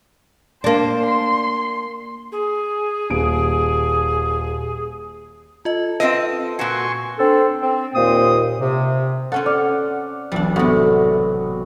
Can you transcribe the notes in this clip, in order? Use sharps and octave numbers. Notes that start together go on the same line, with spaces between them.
A#3 D4 C5
C6
G#4
D#1 D7
F4 A4 D#5
C4 F4 B4 D#5 E6
A#2 F#4 G#5 C6 C#6
C4 D4 A4
C4
D#2 A#2 A#3 C5 D#6
C3
C4 C#4 A4 F#5
D5 F6 C#7
E1 B1 G3 D4
A2 C3 B3 F#4